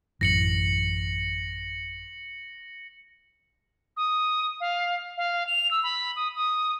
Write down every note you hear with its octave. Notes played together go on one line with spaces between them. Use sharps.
A1 F#2 E3 A#6 C#7 F#7
D#6
F5
F5
F7
E6
B5
D#6
D#6